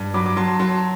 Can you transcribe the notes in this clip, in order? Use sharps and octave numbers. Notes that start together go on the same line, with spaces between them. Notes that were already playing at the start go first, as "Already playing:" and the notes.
Already playing: G2
F#3 B5 D6
D6
F#3 A5 C6
F#3 A5 C6